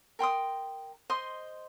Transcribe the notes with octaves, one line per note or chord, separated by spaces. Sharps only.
A#4 G5 C6 D#6
C5 D#5 C6 D#6